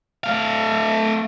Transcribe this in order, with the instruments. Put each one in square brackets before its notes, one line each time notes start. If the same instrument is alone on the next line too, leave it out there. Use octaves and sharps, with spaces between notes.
[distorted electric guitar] A3 F5